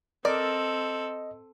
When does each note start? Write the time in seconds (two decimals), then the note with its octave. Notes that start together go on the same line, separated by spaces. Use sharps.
0.25 C4 A4 A#4 D5 D#5